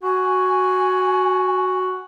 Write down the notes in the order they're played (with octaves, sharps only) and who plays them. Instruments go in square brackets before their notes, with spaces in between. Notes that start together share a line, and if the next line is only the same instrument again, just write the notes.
[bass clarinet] F#4 [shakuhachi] G#5